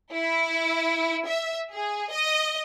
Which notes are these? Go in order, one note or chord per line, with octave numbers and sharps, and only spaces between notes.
E4
E5
G#4
D#5